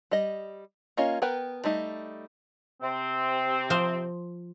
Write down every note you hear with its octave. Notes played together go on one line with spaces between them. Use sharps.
G3 D#5
A#3 C#4 F4 D#5
B3 A#4 B4 G5
G3 A3 D#4 D#5
C3 C4
F3 C5